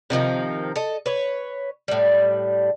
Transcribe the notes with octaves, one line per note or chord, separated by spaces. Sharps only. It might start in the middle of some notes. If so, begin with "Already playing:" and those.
C3 D#3 F3 D#4
A4 D#5
B4 C#5
A2 G3